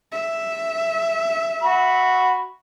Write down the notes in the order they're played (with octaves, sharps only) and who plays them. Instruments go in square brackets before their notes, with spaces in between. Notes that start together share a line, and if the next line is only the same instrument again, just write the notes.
[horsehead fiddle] E5
[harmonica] F#4 B5